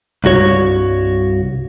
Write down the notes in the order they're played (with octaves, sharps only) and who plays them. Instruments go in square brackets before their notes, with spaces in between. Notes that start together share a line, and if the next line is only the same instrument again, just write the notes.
[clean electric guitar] C2 G2 F#4 C#5